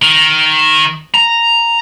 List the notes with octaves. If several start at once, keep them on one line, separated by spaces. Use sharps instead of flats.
D#3
A#5